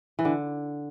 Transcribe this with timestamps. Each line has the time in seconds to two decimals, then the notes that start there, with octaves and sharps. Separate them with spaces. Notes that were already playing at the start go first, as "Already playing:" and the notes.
0.19 E3
0.25 D3